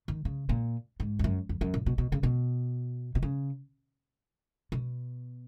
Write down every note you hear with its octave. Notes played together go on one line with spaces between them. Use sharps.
D#3
C#3
A#2
G#2
F2
F#2
F2
F#2
A#2
B2
B2
C#3
B2
B2
C#3
B2